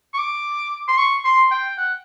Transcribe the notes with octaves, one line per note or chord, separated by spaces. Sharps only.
C#6
D6
C6
C#6
C6
G5
F#5